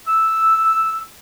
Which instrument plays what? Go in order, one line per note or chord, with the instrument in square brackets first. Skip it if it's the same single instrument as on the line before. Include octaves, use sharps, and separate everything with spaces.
[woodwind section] E6